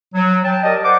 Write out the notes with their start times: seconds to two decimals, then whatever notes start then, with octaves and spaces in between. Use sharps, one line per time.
0.14 F#3
0.44 G5 A5
0.63 G4 A#4 D5 D#5
0.83 C5 F#5 D6